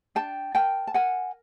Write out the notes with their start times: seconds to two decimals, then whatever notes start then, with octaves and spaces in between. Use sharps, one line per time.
0.15 D4 G5 A5
0.55 A#4 G5 A5
0.87 A5
0.94 A#4 F#5 G#5